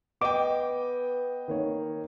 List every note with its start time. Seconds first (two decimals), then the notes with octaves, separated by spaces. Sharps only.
0.22 B3 D#5 G5 D6
1.48 D#3 A#3 C#5